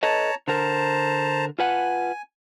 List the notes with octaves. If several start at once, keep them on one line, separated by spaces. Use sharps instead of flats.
A4 B4 C#5 D#5 A5 A#5
D3 A#4 C5 A5 A#5
F4 B4 F#5 G#5